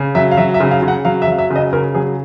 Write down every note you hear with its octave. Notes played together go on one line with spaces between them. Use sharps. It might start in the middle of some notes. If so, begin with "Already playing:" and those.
Already playing: C#3
F#3 E5
F5
F#3 E5
E5
C#3
F5
C#3
F#5
F#3 F5
E5
F#3 F5
E5
C#3
D#5
C#3 A#4
F#3 G#4